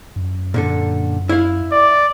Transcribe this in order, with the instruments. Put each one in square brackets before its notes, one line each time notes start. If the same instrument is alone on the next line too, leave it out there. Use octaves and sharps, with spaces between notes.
[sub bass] F#2
[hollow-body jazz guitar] A#2 D3 A4
E4 F5
[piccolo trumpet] D5